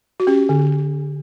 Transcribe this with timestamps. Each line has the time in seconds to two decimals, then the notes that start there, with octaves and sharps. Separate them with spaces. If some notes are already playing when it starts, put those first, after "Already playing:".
0.20 F#4
0.27 C#4 G4
0.49 D3